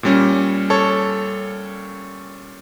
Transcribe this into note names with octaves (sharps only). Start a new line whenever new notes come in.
A#2 G3 C#4
A4 C#5